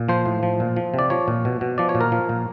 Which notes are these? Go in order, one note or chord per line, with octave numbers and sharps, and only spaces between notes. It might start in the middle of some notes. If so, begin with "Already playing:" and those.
Already playing: A#2
F3 C5
A2
F3
A#2
F3
C3 D5
F3 C#5
A#2
B2
B2
F3 D5
C#5
A#2
A#4
F3
A#2